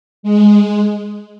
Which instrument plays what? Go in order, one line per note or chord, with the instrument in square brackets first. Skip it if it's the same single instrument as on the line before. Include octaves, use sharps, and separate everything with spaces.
[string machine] G#3